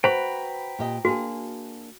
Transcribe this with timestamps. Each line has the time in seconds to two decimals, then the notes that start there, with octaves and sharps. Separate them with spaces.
0.04 F#4 B4 C5 G5 A#5 B5
0.79 A#2 G4 D#5
1.05 A#3 D4 F#4 G#4